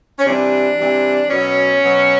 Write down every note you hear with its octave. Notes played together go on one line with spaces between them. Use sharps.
C#4
C3 E3 G3 D4
C3 E3 G3
B2 F#3 C#4
B2 F#3